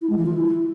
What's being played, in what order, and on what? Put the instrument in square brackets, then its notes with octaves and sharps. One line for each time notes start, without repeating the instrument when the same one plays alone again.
[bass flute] E4
G#3
E3
F4
E4